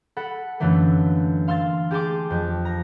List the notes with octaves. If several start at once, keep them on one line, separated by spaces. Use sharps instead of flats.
A4 F#5 B5
F#2 D3 E3 A3 A#3
F5 C6 E6 F6 A6
G4 G#4 A5 C6 D6
F2 G4
A#5